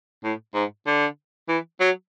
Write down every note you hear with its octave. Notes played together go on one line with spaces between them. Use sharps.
A2
G#2
D3
E3
F#3